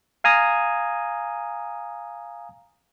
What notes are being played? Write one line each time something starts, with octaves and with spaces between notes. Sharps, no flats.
F5 G#5 A#5 D#6